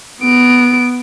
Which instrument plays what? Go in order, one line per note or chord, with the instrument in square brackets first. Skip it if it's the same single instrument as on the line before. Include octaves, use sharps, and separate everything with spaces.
[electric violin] B3 D7